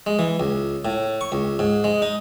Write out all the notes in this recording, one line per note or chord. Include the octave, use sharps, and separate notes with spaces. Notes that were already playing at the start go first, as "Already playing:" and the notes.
G#3
E3
C#2
A2
C#6
C#2
G#2
G#3
D#4